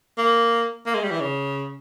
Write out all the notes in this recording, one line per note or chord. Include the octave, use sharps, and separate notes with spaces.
A#3
A#3
G#3
G3
E3
C#3